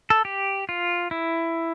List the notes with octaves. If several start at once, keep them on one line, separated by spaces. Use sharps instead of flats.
A4
G4
F4
E4